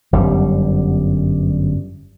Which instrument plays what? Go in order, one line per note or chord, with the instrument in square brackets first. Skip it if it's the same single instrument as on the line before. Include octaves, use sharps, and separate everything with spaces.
[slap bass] G1 F#2 G3